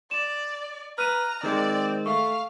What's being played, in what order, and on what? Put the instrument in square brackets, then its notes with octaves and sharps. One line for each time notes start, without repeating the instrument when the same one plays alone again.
[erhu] D5 [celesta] E7
[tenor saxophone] B4 [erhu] A#5 [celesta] F6 D#7
[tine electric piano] D#3 G#3 [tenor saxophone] C4 [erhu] D5
[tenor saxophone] A3 [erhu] F5 [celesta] C#6